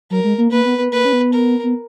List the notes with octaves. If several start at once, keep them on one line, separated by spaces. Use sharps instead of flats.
F#3 A#4
G#3
A#3
A#3 B4
B3
B3
A#3 B4
C#4
B3
A#4
B3